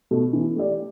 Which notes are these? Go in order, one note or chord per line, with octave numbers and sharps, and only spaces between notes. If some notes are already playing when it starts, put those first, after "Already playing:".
B2 A3
E3
A3 G4 D5